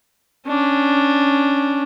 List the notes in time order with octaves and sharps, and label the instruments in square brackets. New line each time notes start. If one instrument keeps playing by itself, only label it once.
[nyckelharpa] C#4 D4